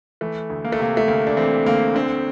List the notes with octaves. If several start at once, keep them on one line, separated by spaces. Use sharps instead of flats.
E3 A3
D2
A#3
A3
C3 A#3
A3
D2 A#3
D4
E3 C4
D2 A#3
D3 C4